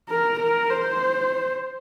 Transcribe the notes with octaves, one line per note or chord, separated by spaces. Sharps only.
A#4
A#4
C5